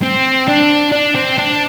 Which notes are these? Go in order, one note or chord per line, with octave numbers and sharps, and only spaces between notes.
C4
D4
D4
C4
D4